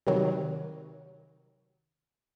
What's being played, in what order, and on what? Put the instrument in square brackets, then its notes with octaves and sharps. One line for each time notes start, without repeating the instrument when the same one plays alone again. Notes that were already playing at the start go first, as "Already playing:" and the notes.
[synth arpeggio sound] C3 D#3 F#3